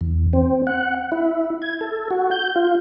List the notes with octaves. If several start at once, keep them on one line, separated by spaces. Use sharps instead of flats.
E2
C4
F#5
E4
G#6
A4
F#4
G6
F4